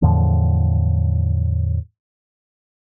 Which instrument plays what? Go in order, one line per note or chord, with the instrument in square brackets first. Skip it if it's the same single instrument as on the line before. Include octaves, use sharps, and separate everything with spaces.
[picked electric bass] E2 A2 D3 F3